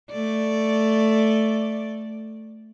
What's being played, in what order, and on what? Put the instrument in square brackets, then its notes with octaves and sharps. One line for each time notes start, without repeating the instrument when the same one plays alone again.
[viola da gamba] A3 D5